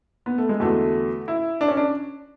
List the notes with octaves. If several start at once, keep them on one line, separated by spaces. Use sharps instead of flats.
B3
A3
G#3
E2 D3 F#3 A3
E4
D4
C#4
D4